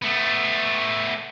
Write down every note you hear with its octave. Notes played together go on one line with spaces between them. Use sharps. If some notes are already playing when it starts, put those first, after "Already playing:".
A3 B3